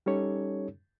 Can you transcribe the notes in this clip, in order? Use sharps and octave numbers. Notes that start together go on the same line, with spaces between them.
G3 C#4 D#4 G4 A4 C#5